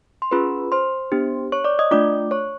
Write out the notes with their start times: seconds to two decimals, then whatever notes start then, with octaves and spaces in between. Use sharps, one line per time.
0.22 C6
0.31 C#4 F4 G#4 B4 B5
0.72 C5 C6
1.12 B3 D4 G4
1.52 C#5 C#6
1.64 D5 D6
1.79 D#5 D#6
1.91 A3 D4 F4 D5 D6
2.31 C#5 C#6